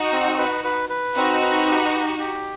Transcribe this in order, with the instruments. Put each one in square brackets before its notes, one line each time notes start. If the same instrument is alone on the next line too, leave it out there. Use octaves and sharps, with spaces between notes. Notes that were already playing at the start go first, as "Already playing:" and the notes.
Already playing: [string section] D#4 F#4
[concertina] C4
B4
B4
B4
[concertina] C4 [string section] D#4 F#4
[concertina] B4
G4
G4
G4